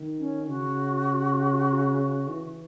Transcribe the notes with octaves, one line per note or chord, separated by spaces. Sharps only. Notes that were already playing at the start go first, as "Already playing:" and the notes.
Already playing: D#3
C#4
C#3 F#4
E3